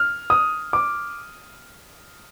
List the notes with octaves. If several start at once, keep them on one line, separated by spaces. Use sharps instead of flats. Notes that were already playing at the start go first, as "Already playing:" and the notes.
Already playing: F6
D#6
D6